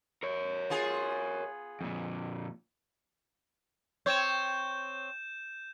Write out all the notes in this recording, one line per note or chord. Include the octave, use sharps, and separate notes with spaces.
A#4 C#5
B3 F4 G#4
F2 A#2
C4 C#5 G6 E7